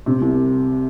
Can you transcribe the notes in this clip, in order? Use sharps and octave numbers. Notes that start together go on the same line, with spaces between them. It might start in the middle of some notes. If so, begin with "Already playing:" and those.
C3
C2